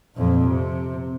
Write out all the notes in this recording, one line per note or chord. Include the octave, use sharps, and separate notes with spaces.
F2 A#2
C3